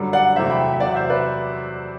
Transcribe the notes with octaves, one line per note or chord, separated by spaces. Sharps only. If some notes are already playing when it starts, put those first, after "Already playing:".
Already playing: F#2 D3 G3
D5 F#5
E2 C3 F#3 A3 C5 E5
G5 B5
E5
E2 C3 F#3 D5 F#5
C5 E5
B4 D5